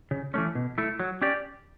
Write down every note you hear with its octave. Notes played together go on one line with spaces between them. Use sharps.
C#3
E3 A3 C#4
B2
A3 E4
F#3
C#4 G4 D5